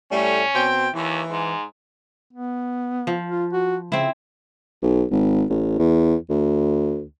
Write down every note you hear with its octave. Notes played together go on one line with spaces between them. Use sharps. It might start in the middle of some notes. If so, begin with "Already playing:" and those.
A2 G3 A3 C#4
B2 C4 G5
D#2 E3
G#2
B3
F3
F4
F#4
C#3 C4 E4
B1
G#1
A1
E2
D2